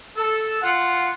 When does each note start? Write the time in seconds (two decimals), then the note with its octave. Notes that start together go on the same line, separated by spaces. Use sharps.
0.17 A4
0.62 F4 F#5